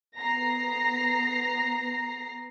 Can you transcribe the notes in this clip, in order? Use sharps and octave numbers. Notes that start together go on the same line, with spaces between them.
B3 A#5 A#6 C7